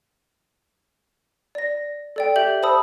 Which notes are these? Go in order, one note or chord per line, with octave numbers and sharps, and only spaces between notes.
D5 A#6
A4 D5 G5
G4 E5 G6 F#7
C5 A5 B5 D#6 E6